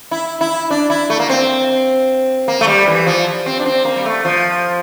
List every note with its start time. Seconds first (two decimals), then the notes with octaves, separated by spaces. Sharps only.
0.11 E4
0.41 E4
0.70 D4
0.90 E4
1.10 A3
1.19 A#3
1.29 C4
2.48 A#3
2.61 A3
2.67 G3
2.87 E3
3.06 F3
3.46 C4
3.60 D4
3.65 C4
3.85 A#3
3.96 G3
4.05 A3
4.25 F3